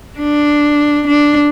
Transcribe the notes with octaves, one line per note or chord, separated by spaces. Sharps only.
D4
D4